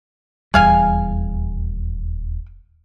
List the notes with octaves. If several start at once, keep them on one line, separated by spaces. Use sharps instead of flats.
D#1 E2 G3 G#4 F5 G#5